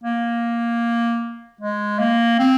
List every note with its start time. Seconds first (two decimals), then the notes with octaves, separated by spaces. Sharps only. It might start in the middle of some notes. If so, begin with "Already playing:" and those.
0.04 A#3
1.61 G#3
1.99 A#3
2.39 C4